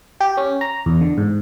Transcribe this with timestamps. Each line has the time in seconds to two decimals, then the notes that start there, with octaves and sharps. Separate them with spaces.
0.21 G4
0.37 C#4
0.61 A#5
0.86 E2
1.01 D3
1.18 G#2